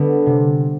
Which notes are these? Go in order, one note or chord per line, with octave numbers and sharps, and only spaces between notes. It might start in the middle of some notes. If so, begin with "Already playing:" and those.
Already playing: D3 G3 B3 D4
C3